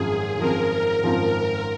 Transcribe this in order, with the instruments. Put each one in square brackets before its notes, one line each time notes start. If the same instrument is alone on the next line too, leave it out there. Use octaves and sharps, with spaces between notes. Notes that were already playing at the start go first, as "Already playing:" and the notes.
Already playing: [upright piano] G#1 F#2 F3 C4 F4 [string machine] G#4
[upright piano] G#1 F#2 F3 C4 F4 [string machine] A#4
[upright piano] G#1 F#2 F3 C4 F4